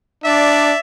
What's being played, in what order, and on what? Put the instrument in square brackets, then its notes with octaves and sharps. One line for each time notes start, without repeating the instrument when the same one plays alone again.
[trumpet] D4 [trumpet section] D5 E5